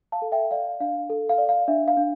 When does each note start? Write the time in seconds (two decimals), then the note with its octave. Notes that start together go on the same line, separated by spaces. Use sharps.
0.12 F5 A5
0.22 A4
0.32 E5 G5
0.51 D5 F5
0.80 D4 F5
1.10 A4
1.29 F5
1.38 D5
1.49 F5
1.68 D4 E5
1.88 F5
1.97 D4